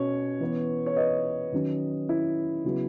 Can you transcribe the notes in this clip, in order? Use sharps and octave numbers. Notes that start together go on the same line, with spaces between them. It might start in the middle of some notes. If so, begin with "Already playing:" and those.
Already playing: B2 C#4 C#5
E3 B3
C#5
B4 D#5
D#3 F#3 C#4
E4
C#3 F#3 B3